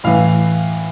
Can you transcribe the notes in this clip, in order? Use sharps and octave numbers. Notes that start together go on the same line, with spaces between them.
A2 E3 F5